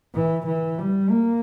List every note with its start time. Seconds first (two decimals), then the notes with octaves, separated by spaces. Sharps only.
0.15 E3
0.47 E3
0.79 G3
1.11 A#3